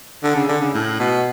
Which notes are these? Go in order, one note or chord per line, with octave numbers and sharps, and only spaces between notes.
D3
C#3
D3
C#3
A2
B2